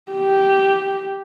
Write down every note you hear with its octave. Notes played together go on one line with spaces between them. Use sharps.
G4